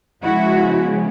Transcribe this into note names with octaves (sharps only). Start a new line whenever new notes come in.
C#3 F3 G#3 B3 E4 F#4